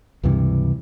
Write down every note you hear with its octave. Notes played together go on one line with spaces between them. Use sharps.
C#2 G2 C3 E3